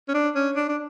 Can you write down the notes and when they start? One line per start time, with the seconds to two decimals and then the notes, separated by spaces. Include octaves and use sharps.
0.09 C#4
0.14 D4
0.35 C#4
0.56 D4
0.69 D4